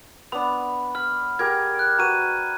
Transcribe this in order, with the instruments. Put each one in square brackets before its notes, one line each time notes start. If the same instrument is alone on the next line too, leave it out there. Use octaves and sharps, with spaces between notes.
[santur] B3 D4 [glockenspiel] B5
[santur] B5 [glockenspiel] F6
[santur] G4 G#4 A#4 [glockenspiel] G#6
[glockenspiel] F#6
[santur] F#4 B4 [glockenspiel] A#5 D#7